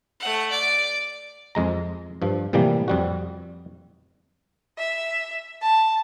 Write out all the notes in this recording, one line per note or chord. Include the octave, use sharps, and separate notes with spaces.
A3 F#5
D5
F2 G#3 A#5
G2 F3
A2 C3 E3 F3 G3 A#3
F2 G3 F#4
E5
A5